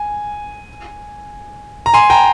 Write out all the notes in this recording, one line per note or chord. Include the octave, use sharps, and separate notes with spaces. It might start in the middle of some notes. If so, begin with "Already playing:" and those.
Already playing: G#5
A#5
G#5 C6
G5 A#5